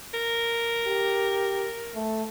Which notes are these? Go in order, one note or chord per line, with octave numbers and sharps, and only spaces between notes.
A#4
G4
A3